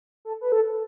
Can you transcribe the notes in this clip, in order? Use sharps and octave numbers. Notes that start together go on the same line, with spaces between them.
A4
B4
A4